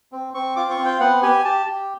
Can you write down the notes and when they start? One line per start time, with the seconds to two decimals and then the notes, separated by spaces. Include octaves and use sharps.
0.12 C4
0.34 C4 C#6
0.56 F4 D6
0.71 C#6
0.78 C4
0.85 G5
1.00 B3 F#5
1.22 G4 G#5
1.45 G4 A5
1.66 G4